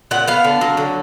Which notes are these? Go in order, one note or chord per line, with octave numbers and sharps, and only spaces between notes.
A#2 F#5
B3 F5
D3
F#3
D3